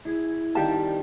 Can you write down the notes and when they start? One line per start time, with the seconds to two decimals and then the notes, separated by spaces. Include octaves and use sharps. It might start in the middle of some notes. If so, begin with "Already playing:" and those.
0.05 E4 G#4
0.55 D#3 G3 C4 G4 F5 A5